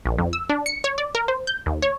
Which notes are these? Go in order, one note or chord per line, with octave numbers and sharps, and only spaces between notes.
A#1
F2
E6
D4
C#7
C#5
D5
A#4
C5
G6
D#2
C#5